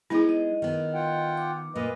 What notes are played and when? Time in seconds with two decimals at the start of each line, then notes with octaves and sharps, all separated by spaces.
0.10 G#3 B3 D#4 E4 G#4
0.29 D#5
0.62 D#3 B3
0.94 F4 F#5 G5
1.37 D6
1.76 A#2 A#3 B4 D#5